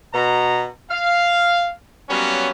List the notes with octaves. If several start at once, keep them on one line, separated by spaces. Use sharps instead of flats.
B2 A#5
F5
F#3 G3 A#3 B3 C#4